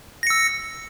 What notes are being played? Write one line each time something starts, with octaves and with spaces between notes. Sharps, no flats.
E6 A#6 C#7